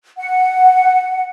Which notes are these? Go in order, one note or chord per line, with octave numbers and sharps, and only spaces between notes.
F#5